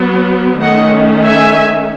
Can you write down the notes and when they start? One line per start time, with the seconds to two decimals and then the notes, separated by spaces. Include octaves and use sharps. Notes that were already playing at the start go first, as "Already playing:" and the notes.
Already playing: F#3 B3
0.61 D#3 A3 C#4 D#5 F#5
1.23 E5 G#5